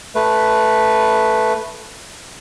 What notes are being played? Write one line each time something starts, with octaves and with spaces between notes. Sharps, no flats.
A3 B4